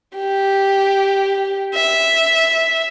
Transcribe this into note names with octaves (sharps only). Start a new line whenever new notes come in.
G4
E5